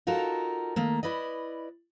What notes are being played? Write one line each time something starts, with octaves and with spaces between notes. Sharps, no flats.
D#4 F4 F#4 A4 A#4
D#3 A3 A#3
E4 B4 D5 D#5